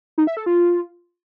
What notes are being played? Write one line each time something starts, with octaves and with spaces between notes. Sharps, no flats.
D#4
E5
A4
F4